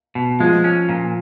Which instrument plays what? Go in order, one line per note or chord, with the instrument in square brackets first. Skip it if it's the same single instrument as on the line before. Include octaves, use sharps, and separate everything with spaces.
[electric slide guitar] B2
[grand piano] F3 F4 [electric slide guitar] G#3
[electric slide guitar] C#4
A#2